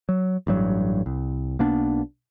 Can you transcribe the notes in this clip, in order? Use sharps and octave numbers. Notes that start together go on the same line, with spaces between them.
F#3
A1 G2 F#3
C2
B1 A#3 B3 D4